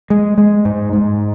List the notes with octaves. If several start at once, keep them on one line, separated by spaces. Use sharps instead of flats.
G#3
G#3
G#2
G#2